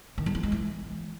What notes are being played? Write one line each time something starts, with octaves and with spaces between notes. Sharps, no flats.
D#3
G3
F3
G#3
E3